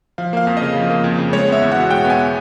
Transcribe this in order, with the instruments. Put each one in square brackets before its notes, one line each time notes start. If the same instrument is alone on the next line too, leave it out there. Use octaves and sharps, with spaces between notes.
[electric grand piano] F3 F5
A#3 F5
F2
C#3 D#5
F3
A#3
F2
C#3
G#3 C#5
B3 E5
E2
B2 F#5
G#3 G5
B3
G#5